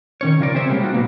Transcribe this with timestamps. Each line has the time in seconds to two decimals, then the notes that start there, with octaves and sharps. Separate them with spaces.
0.21 D#3 C#4 C#5
0.40 C#3 F3 A#4 D5
0.54 C4 G#4 C5 C#5 E5
0.68 C3 G3 G#3 A#3 G4
0.81 G3 D#4 F4 F#4
0.94 A#2 F#3 A#3 B3